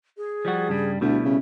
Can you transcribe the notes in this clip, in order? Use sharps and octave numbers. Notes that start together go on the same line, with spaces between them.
G#4
F3 G3 F#4
G2 C#3 G3
D2 B2 G3 A3 E4
C#3